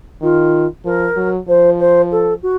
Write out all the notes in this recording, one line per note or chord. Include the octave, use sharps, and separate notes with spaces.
D#3 F4
F3 A#4
F#3
F3 C5
C5
A4
F#4